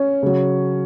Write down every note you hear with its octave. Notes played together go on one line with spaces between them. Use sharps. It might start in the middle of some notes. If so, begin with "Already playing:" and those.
Already playing: C#4
C#3 F#3